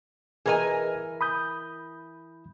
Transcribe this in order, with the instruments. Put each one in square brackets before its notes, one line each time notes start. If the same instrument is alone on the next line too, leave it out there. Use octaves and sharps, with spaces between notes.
[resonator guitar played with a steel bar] E3 A#4 G#5 [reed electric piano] G#4 B4 D#5
[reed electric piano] B5 D#6 G6